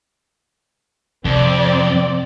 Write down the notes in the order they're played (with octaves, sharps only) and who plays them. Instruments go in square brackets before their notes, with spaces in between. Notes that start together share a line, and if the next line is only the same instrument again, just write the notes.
[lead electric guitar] F2 [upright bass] C3 [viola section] C4 D5